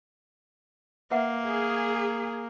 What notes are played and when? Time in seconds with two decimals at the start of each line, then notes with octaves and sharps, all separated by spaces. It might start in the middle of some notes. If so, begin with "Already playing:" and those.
1.11 A#3 B4 E5 F#5
1.47 G#4